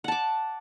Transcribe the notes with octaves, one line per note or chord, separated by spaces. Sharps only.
F#5 A5 D6